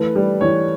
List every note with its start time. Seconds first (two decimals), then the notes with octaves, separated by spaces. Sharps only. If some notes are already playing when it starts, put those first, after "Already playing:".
Already playing: E3 A3 B4
0.16 G3
0.41 E3 C#5